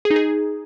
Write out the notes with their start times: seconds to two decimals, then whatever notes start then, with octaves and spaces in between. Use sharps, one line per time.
0.05 G#4
0.11 D#4
0.16 G#4